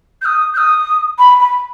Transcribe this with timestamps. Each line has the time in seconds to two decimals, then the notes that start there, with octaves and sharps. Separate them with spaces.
0.21 G6
0.25 D#6
0.53 G6
0.57 D#6
1.18 B5
1.39 B5